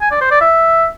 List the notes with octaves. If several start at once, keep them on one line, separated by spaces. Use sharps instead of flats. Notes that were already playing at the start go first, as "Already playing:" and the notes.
G#5
D5
C5
D5
E5